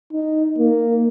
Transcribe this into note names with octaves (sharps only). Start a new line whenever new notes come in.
D#4
A#3